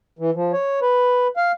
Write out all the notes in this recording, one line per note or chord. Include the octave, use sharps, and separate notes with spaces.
E3
F3
C#5
B4
F5